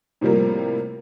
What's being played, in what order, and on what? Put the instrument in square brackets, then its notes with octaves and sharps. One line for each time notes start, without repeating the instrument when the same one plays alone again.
[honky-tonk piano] A2 C3 F3 G3 A#3